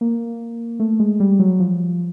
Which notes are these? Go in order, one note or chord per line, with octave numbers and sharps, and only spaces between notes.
A#3
A3
G#3
G3
F#3
F3